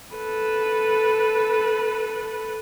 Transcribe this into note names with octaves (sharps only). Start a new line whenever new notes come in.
A4 B4